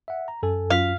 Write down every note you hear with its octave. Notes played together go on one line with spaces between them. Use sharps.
E5 F#5
A#5
F#2 A4 G#5
F#2 F4 F5 B6